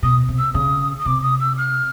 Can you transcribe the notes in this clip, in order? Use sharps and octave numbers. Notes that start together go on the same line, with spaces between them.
B2 D#6
C3
E6
C#3 D#6
D#6
C3 D6
D#6
E6
F6